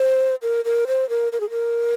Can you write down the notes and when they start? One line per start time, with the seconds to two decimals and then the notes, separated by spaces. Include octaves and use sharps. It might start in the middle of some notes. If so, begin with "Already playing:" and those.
Already playing: C5
0.42 A#4
0.65 A#4
0.87 C5
1.09 A#4
1.32 A#4
1.40 G#4
1.50 A#4